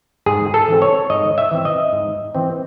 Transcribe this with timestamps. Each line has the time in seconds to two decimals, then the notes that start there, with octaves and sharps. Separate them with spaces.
0.26 G#2 G#4
0.54 A4
0.68 E3 C4
0.82 C#5
1.10 G#2 D#5
1.38 E5
1.51 E3 C4
1.65 D#5
1.93 G#2
2.35 E3 C4